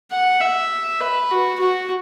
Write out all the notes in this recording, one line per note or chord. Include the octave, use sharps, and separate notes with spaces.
F#5
E5
B4
F#4
F#4